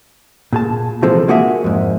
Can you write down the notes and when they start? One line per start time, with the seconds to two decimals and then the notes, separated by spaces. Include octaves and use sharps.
0.53 A#2 G#4 A5
1.02 C3 E3 F3 G#3 C4 A4
1.28 G#3 A#3 F#4 G#4 C#5 E5
1.64 F2 G#2